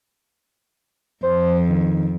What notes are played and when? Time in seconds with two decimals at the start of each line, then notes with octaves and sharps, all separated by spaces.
1.23 F2 C5
1.69 D#3